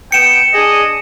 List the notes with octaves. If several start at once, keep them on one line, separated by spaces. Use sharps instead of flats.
B3 G5 C#7 E7
D4 G#4 D#5